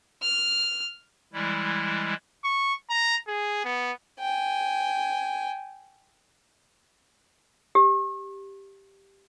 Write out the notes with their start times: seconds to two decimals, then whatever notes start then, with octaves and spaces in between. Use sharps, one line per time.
0.22 F6
1.33 E3 G3 G#3 E4
2.44 C#6
2.90 A#5
3.28 G#4
3.65 B3
4.19 G5 G#5
7.75 G4